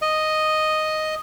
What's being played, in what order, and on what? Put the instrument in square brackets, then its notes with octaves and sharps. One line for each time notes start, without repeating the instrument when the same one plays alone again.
[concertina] D#5